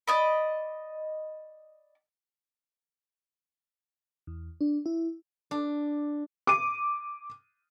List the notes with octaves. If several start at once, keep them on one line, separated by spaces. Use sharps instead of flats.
D5 D#5 B5
E2
D4
E4
D4
D6 D#7